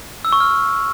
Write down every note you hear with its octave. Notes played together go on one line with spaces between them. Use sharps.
E6
C#6
F6